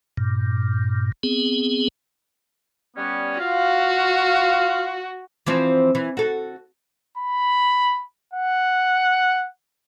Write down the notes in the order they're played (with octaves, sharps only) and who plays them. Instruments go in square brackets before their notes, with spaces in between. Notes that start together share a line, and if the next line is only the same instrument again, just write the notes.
[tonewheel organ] G2 A#2
B3 C4 G#4
[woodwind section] G3 B3 C#4
[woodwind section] F4 F5 [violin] F#4
[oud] E3 F3 C4
E3
F#4 A4
[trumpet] B5
F#5